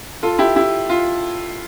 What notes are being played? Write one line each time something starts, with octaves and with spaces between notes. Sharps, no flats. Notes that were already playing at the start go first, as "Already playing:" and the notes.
F4 A4
E4 G4
E4 G4
F4